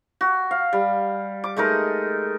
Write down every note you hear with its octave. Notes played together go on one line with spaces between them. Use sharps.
F#4
F5
G3
D6
G#3 A3 D#4 A#4